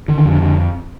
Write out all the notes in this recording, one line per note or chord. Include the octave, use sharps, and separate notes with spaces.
D3 D#3
F2
D3
D3